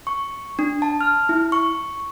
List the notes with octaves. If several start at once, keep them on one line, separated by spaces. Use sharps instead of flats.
C#6
D4
A5
F6
E4
C#6